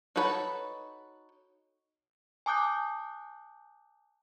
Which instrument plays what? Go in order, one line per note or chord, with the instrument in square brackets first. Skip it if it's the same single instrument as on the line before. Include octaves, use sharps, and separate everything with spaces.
[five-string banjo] D#4 F#4 A4 B4 C#5
[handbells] G#5 A5 D6 D#6 F#6 G6